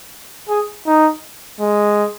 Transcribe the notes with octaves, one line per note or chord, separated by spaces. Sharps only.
G#4
D#4
G#3